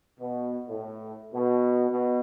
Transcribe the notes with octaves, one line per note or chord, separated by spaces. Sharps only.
B2
A2
B2
B2